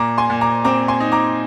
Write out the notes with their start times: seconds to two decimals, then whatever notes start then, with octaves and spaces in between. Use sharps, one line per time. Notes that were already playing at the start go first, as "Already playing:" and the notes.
Already playing: A#2 A#5 D6
0.18 G#5 C6
0.30 A#2
0.41 A#5 D6
0.64 C4 A#5 D6
0.88 G#5 C6
1.00 D#4
1.12 A#5 D6